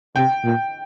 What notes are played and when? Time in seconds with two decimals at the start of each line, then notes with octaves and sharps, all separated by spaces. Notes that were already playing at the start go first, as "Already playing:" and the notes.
0.16 C3 G5
0.44 A#2